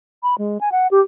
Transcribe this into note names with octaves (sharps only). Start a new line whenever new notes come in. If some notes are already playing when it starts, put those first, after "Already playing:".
B5
G#3
G#5
F#5
G4